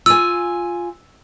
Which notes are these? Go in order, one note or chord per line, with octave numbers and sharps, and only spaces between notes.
F4 G#5 E6